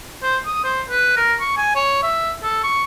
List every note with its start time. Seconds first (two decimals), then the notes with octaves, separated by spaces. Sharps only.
0.23 C5
0.46 D#6
0.64 C5
0.90 B4
1.17 A#4
1.41 C#6
1.58 G#5
1.76 C#5
2.03 E5
2.43 A4
2.63 C#6